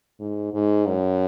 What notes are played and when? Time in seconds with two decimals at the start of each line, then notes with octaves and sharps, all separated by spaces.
0.20 G#2
0.54 G#2
0.88 F#2